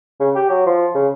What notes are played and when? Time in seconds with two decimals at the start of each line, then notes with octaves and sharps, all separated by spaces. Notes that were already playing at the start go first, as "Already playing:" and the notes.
0.20 C#3
0.35 G4
0.50 F#3
0.67 F3
0.95 C#3